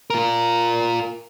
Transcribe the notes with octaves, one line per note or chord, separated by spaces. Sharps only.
F4 A#4